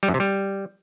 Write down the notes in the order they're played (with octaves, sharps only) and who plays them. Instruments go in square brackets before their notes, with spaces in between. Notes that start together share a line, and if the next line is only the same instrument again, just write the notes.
[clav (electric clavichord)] G3
F#2
C3
G3